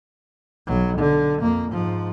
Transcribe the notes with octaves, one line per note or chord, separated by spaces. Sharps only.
B1 F#3
D3
F2 A#3
G#2 F3